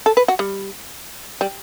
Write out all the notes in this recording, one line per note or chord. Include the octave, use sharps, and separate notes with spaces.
A4
B4
F#4
G3
G3